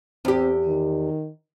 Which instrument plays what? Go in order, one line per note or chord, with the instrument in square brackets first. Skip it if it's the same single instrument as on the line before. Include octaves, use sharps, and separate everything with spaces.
[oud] E2 G4 [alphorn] C4
[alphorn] D#3